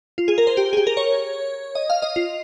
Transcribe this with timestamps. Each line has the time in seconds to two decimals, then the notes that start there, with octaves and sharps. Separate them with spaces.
0.18 F4
0.28 G#4
0.38 A#4
0.47 C5
0.57 G4
0.73 G#4
0.77 G4
0.87 A#4
0.97 C#5
1.75 D#5
1.90 F5
2.02 D#5
2.16 F4